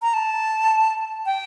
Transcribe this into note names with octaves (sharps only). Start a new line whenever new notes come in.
A#5
A5
G5